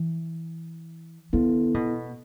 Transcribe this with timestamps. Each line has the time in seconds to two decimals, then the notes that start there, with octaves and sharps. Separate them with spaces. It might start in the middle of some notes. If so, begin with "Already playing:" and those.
Already playing: E3
1.33 D3 B3 E4 A4
1.74 B2